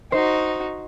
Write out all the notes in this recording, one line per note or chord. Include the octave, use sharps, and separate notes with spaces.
D#4 F#4 C5